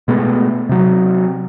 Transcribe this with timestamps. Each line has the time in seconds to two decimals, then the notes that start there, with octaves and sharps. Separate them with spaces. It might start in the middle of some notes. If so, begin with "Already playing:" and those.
0.08 B2 G#3 A3 B3
0.69 C3 F#3